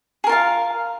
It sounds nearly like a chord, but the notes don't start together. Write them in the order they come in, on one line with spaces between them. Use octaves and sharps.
G#4 A#4 F4 F5